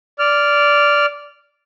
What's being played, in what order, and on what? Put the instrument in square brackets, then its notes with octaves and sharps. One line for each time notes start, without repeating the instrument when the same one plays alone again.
[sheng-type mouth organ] D5 F6